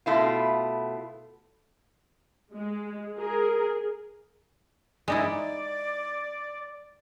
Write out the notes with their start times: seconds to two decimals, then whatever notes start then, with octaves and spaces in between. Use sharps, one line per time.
0.06 B2 A3 E4 F4
2.54 G#3
3.19 G#4 A#4
5.08 G#3 D#4 E4 D5